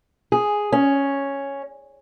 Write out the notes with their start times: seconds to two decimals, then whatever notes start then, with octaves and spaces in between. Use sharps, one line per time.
0.32 G#4
0.72 C#4